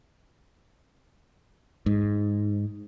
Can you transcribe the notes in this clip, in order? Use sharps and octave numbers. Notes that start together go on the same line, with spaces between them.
G#2